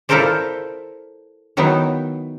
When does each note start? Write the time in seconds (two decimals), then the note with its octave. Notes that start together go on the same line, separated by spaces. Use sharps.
0.09 E4 F4 A4 A#4 C5 D5
1.57 D#3 F#3 B3 D#4 E4